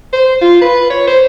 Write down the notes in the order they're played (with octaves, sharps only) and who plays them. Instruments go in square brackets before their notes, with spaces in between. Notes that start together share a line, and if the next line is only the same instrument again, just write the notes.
[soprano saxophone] C5
F4
B4
C#5
C5